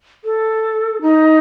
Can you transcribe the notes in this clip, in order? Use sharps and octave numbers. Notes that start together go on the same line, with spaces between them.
A4
D#4